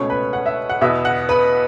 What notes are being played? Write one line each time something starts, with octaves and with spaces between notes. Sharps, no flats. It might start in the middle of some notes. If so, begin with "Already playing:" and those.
Already playing: C#2 B2 A3 C#4 C#5 C#6
B4 B5
F#5
E5
F#5
E2 B2 B3 E4 E5
F#5
B4 B5